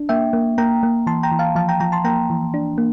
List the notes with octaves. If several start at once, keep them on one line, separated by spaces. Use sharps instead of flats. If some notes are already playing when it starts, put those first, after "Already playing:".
Already playing: D4
A#3 E5 G5
A#3
A#3 G5 A#5
A#3
E3 A5 C6
G5 A#5
E3
F5 A5
F3 F5 A5
G5 A#5
F3 G5 A#5
A5 C6
A#3 G5 A#5
E3
D4
A#3